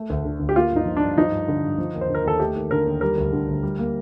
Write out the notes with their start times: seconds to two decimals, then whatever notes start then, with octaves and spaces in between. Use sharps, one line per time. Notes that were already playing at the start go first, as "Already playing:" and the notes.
Already playing: A3
0.10 D2
0.25 D3
0.40 D2
0.49 G4
0.56 A#3 F4
0.71 G2 D#4
0.86 F3
0.97 G2 D4
1.18 F3 D#4
1.32 G2
1.48 D3
1.64 G2
1.78 F3
1.95 D#2
2.01 C5
2.09 D3
2.15 A#4
2.24 D#2 A4
2.40 A3 G4
2.56 D#2
2.71 D3 A#4
2.86 D#2
3.01 G3 A#4
3.18 D2
3.33 D3
3.48 D2
3.63 G3
3.79 A#3